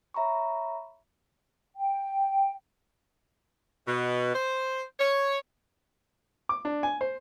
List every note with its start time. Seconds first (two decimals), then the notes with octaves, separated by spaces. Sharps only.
0.14 C#5 E5 A#5 B5 C#6
1.77 G5
3.87 B2
4.34 C5
5.00 C#5
6.49 D6
6.65 D4
6.83 G#5
7.01 C5